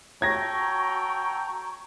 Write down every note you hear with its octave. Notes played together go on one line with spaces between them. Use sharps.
F#4 A4 C#5 G5 A#5 C#6 G#6 A#6